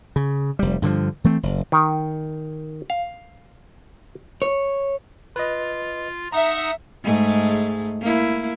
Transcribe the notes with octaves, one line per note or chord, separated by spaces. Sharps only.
C#3
F1 G3
G2 D3 D#3 F3
E3 A3 C4
F#1
D#3
F5
C#5
F4 B4 D#5
D#4 E5 F#5 A#5 D#6
G#2 G#3 A3
A#3 E4